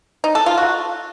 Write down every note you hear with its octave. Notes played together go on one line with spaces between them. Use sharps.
D#4
A4
F4
F#4